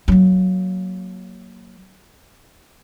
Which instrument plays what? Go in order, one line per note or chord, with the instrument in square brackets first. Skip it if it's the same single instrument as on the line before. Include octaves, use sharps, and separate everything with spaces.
[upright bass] F#3 A#3